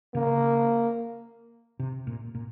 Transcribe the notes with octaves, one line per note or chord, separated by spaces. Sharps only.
C#3 A#3
C3
A#2
A#2